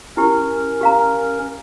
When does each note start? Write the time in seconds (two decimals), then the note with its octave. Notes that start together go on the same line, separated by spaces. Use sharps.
0.17 C#4 E4 G4 A#4
0.81 G4 F5 A#5